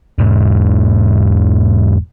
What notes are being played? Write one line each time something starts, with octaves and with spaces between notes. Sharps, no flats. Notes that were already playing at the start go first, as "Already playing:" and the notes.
E1 G#2